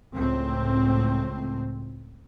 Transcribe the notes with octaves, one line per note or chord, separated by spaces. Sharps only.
C#2 A2 C4